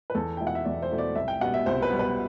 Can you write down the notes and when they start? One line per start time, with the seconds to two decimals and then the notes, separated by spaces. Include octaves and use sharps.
0.10 B4
0.15 E2 A4
0.37 B2 A3 E4 G5
0.47 F#5
0.55 E5
0.65 E2 D5
0.82 C5
0.91 B2 A3 E4
0.98 D5
1.15 C2 E5
1.28 G5
1.41 B2 G3 B3 F#5
1.54 E5
1.66 C2 C5
1.82 B4
1.90 B2 G3 B3
1.99 B4